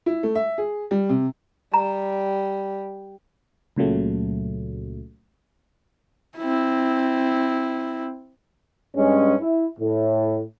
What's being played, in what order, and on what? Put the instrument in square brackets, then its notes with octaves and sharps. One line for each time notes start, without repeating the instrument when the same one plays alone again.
[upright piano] E4
A3
E5
G#4
G3
C3
[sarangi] G3 [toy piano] A#5
[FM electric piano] C#2 A#2 C#3 F#3 A3
[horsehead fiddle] C4 E4
[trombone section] G2 G#3 C#4
E4
A2